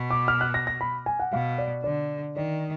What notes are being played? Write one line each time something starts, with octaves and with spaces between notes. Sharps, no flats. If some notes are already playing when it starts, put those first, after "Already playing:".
Already playing: B2
D6
F6
F#6
A#6
A#6
B5
G#5
F#5
B2 F5
D5
D3 D5
D#3 D5